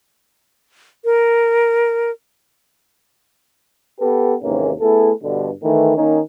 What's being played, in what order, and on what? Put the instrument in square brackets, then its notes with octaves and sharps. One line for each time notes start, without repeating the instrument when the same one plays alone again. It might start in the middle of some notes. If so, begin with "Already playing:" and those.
[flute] A#4
[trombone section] B3 G4 A4 B4
D#2 G#2 C3 E3 A#3 C#4
A3 B3 E4 G#4 A4
G2 B2 D3
D#3 E3 A3
D#3 A#3 C#4 D#4